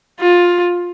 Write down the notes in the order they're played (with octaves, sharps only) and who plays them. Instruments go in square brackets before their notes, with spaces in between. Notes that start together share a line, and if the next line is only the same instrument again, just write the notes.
[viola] F4